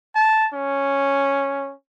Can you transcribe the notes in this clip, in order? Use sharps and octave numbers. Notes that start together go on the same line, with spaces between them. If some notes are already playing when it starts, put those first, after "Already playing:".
A5
C#4